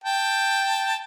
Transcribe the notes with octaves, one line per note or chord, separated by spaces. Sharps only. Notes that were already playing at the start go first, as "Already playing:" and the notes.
G5 A5